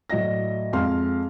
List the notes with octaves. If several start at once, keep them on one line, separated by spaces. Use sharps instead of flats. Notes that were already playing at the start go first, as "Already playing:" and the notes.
A2 F#3 D5 D#5 A#6
F2 G#3 F5 C6 F6